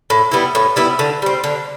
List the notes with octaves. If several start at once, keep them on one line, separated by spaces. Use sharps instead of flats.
A2
G3 B3 E4
A2
G3 B3 E4
D3
G3 C4
D3